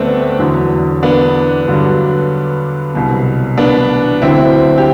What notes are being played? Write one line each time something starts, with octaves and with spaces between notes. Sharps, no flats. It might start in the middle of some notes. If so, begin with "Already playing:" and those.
Already playing: D2 D3 A3 B3 C4 D4
E2 D3 F#3
B3 D4
G2 D3 F#3
C2 B2 F#3
B3 D4
D2 D3 F#3 C4 E4
G4